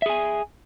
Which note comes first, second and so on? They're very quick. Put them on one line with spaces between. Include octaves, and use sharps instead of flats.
E5 G#4 G#5